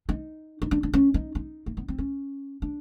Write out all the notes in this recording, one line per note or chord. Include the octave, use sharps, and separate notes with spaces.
D#4
D#4
D4
D4
C#4
D#4
D#4
A#3
B3
C4
C#4
D4